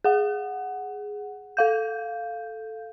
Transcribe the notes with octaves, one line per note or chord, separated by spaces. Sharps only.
G#4 F#5
A4 F5 G6